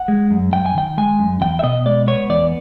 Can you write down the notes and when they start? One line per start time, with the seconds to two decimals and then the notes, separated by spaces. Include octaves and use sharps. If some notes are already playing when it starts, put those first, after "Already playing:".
Already playing: F#5
0.08 G#3
0.31 F#2
0.53 F#2 G5
0.66 G#5
0.75 D#3 G5
0.98 G#3 G#5
1.19 F#2
1.41 E2 G5
1.59 E5
1.63 B2 D#5
1.86 G#3 D5
2.07 B3 C#5
2.30 E2 D5